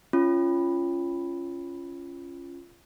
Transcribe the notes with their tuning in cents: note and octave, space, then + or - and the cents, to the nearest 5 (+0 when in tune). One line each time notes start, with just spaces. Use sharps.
C#4 +0 F4 -20